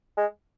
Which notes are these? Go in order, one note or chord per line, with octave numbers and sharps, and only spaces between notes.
G#3